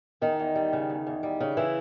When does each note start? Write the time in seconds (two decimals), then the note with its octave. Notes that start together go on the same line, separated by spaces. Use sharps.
0.21 E2 D#3 D#4
0.40 E2
0.55 G3
0.73 C#3
0.90 E2
1.07 E2
1.23 G3
1.41 C#3
1.57 E3 E4